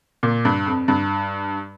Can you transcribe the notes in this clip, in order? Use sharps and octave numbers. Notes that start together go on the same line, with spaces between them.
A#2
G2
F2
G2